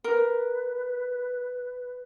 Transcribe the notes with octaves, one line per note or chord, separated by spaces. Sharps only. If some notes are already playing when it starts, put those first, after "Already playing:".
A#4 B4